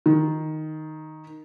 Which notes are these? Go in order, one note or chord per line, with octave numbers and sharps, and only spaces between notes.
D#3